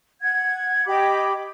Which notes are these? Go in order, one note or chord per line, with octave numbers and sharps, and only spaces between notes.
F#5 G#6
G4 D#5 B5 D6